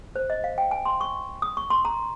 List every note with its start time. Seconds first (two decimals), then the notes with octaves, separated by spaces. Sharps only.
0.16 C5
0.30 D#5
0.44 F5
0.58 G5
0.71 G#5
0.86 C6
1.01 C#6
1.42 D#6
1.57 C#6
1.70 C6
1.85 A#5